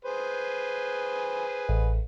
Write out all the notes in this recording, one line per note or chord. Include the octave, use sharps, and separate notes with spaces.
G#4 B4 C5
A1